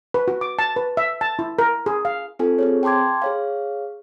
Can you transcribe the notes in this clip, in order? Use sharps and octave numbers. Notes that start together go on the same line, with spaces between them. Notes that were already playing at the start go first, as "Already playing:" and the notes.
B4
F#4
D6
A5
B4
E5
A5
E4
A#4
G#4
F5
C4 F4 A4 G#5
C4 G#4 C#5
G5 A5 C6 D6 G#6
G#4 C#5 F5